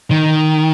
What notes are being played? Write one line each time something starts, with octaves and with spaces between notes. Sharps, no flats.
D#3